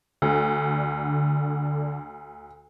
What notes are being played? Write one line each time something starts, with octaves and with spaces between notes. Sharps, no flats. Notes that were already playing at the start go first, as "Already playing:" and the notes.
D2 D3